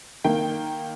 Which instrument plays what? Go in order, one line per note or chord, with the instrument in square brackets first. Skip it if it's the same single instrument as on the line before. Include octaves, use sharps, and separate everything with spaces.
[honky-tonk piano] D#3 A#3 G5